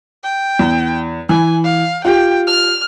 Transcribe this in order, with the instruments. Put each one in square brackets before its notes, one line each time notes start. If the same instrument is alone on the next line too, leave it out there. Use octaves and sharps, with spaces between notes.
[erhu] G5
[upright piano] E2
[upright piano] E3 [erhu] G#5
[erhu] F5
[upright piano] F4 G4 [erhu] G5
[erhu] F6